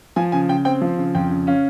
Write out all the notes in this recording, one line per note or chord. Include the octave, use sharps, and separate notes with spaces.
F3 G#5
C#3 G#5
C#3 G5
C4 G5
F3
C#3
F2 G5
C#3
C#4 F5